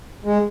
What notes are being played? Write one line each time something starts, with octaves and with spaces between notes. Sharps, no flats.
G#3